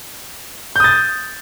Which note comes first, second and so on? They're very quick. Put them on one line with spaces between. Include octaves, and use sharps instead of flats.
G6 D#6 A6